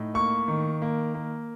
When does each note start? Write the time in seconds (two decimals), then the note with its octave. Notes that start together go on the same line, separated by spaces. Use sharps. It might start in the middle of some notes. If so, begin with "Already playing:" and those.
Already playing: A2 D#4
0.14 A#3 C#6
0.48 D#3
0.82 A#3
1.14 A#3